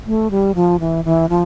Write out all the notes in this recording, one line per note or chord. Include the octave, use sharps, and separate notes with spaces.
A3
G3
F3
E3
E3
F3